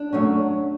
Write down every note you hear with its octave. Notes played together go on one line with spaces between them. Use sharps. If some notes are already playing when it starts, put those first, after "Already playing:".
Already playing: D4
F#2 D3 F#3 A3 C#4